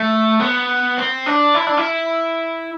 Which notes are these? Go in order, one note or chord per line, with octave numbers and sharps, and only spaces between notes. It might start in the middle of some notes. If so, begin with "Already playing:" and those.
Already playing: A3
B3
C4
D4
E4
D4
E4